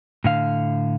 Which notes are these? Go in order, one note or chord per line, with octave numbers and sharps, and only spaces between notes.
A2 D3 F5